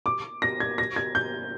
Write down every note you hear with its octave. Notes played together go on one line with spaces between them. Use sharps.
D6
A#6
G#6
A#6
G#6
G6